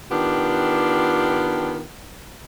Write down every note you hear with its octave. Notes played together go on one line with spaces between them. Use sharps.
D#3 B3 D4 F4 G4